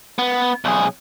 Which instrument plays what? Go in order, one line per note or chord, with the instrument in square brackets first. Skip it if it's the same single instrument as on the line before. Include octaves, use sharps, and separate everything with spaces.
[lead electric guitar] B3
B1 G#4